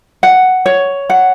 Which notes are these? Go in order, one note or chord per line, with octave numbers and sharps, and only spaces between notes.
F#5
C#5
F#5